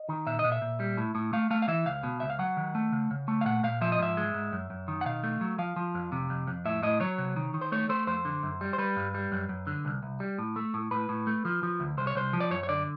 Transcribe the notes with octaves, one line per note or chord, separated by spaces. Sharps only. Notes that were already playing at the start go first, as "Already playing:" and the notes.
Already playing: D#5
D#3
A#2 E5
D#5
A#2
E5
A#2
G3
A2
A2
A3 F5
A3 F5
F5
E3 E5
C#2 F5
B2
C#2 E5
F5
F#3 F#5
D#3
A3
C#3
C#3
A3
F5
A#2 F#5
A#2 F5
F3 E5
D#5
G#2 E5
G#3
G#2
F#2
F#2
D#3
F#5
B2 F5
A3
F#3
F3 F5
F3
F2
C3
F2
F2
A2 E5
A2 D#5
F#3 C#5
C3
D#3
D#3
C5
A3 C#5
A3 C5
F2 C5
D3
F#2
G3
C5
G3 B4
G2
G3
F#2
F#2
D3
C2
C2
G3
A2
A3
A2
A2 B4
A2
A3
F3
F3
D2
C2 C5
C#5
C2 C5
F3
D5
F#2 C#5
C#5
D3 D5